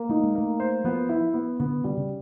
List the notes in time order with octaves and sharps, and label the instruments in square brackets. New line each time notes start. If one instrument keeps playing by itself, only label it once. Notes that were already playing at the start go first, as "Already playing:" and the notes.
Already playing: [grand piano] A#3
[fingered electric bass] A3 [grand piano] D#4
[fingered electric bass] G#3
[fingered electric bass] A3 [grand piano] A#3
[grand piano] C5
[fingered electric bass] F3 [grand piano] B3
[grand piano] E4
B3
[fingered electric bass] D3 [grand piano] B3
[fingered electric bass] D3 [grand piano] G3
[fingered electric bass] C#3